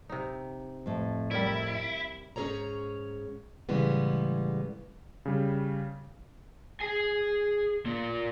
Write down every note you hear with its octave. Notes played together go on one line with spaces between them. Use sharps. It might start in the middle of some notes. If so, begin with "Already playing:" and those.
C3 D#4
F2 A2
G3 E4 A#4 D5
G#2 C#4 G#4 A4 C#5 A#5
A2 C#3 E3 G3 G#3 B3
C#3 G3
G#4 G#5
A#2 A#3